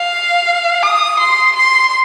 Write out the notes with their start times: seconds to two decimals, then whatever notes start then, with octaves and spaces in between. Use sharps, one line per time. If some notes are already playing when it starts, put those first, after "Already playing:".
Already playing: F5
0.83 D#6
1.19 C6
1.56 C6